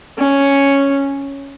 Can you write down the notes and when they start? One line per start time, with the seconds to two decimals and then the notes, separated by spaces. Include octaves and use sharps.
0.18 C#4